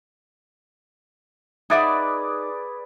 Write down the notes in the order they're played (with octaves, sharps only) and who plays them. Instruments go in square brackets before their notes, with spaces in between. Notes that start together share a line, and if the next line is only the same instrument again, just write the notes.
[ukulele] D#4 E5 F#5 [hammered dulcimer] G#4 B4 D5